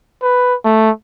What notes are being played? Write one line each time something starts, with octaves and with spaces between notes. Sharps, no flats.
B4
A3